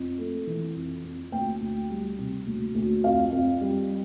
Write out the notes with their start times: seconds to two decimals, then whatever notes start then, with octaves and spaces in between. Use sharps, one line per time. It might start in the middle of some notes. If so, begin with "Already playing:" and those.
Already playing: F2
0.18 A3
0.47 E3
0.75 F2
1.04 F2
1.32 D2 G5
1.61 D2
1.90 G3
2.19 C3
2.47 D2
2.75 D2
3.04 F2 F5
3.32 F2
3.61 G3